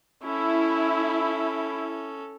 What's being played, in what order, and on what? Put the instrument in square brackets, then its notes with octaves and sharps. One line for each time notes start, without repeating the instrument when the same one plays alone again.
[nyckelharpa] C#4 A4 [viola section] E4